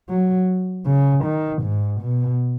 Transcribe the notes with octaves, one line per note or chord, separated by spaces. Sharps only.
F#3
C#3
D#3
G#2
B2